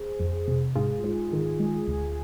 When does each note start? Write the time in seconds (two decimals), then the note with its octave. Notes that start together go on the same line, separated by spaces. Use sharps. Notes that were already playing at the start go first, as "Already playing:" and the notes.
Already playing: G#4 C5
0.20 F2
0.48 C3
0.75 G#2 F4 G#4
1.04 G#2
1.33 D#3
1.60 G#3
1.88 D2